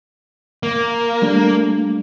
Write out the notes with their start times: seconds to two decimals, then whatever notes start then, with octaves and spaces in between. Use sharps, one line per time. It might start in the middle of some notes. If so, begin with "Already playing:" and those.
0.63 A#3
1.22 G3 A3 D4